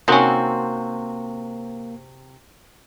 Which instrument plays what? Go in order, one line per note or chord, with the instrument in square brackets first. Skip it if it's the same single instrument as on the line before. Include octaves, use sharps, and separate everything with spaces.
[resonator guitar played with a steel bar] C3 C4 F#4 [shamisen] D#3 C#4 [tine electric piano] A#3